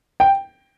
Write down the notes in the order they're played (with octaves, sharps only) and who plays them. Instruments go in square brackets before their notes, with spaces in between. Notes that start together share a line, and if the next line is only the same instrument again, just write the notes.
[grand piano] G5